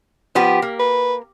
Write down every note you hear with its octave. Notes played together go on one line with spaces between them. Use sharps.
F3 B3 G4
A#3
B4